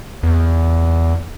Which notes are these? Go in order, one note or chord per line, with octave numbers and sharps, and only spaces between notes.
E2